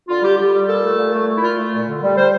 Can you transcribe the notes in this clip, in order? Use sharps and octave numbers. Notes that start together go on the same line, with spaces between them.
D3 F4
G3 G4
G3 G4
G3
A#2 A4
A3
A#2
A3
A3
E4
A#2 F4
A3
A#2
D3
G3
G3 C5